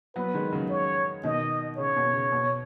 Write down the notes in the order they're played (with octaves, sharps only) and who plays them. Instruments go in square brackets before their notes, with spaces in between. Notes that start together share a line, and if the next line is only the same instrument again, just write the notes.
[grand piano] F#3 B3 [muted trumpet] B4
[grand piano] D#3 G#3
C#3 F#3
[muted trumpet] C#5
[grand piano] B2 D#3 [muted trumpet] D#5
[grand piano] C#3 [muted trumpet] C#5
[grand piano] B2
C#3
B2